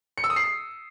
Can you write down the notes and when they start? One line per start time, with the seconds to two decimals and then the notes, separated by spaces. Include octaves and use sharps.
0.18 C#7
0.24 E6
0.30 D#6
0.36 C7